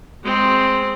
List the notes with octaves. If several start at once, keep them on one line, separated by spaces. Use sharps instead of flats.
G#3 C4